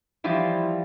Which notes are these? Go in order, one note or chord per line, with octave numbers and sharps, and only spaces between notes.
E3 F3 G3 E4 F4